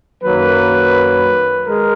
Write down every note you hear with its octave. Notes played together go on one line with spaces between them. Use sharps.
F#2 D#3 F#3 A#3 B4
G#3 A#4